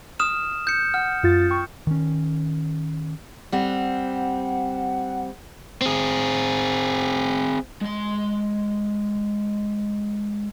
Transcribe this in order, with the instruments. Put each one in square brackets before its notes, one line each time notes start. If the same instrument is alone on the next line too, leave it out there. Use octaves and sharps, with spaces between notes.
[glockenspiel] D#6 F6 E7
G6 C#7
[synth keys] F#5 [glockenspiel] F6
[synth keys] F#2 F4 A6
G5 C#6
[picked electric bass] D#3 C#4
[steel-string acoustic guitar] G3 C4 [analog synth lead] F#5
[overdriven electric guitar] C4 G#4
G#3 C6